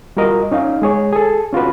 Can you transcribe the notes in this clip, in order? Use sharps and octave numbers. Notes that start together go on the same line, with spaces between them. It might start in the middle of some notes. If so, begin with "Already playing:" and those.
G3 F4 F#4 A#4 D#5
C#4 D#4 F5
G#3 G#4 C#5
G#4 A4
C#4 F4 F#4 B4